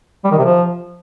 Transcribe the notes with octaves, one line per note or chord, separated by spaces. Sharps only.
G3
D#3
C3
F3